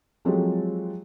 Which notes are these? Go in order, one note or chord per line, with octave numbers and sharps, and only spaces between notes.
F3 F#3 G#3 C4 G4 A4